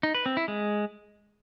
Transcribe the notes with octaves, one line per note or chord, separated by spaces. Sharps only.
D#4
B4
C4
E4
G#3